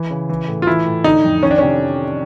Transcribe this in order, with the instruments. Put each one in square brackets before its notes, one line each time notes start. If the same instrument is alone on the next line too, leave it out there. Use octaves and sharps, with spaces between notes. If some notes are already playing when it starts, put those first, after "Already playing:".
Already playing: [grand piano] E3
C#3
E3
A2
F4
E3 E4
A2
D3 D#4
F2
D#3 C#4
D4
C3 C#4